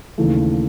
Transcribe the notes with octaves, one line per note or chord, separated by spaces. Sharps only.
D#2 C#3 E3 A3